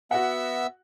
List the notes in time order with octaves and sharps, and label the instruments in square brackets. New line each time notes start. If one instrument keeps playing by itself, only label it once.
[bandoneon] B3 E5 E6 [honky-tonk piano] F#4 F#5